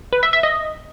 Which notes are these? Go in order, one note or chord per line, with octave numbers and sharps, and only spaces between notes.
B4
E5
E5
D#5